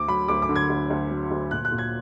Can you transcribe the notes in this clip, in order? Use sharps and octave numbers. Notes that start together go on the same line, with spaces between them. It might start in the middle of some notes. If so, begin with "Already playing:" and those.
Already playing: D2 D6
F#3 B5
D2 D6
D6
D3
G#6
D2
D2
F#3
D2
A#2 F#6
F#6
A#2
G#6